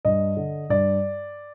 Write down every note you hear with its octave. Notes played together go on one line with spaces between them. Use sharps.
G2 D#5
D3
G2 D5